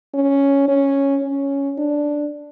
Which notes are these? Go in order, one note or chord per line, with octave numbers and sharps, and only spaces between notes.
C#4
C#4
C#4
D4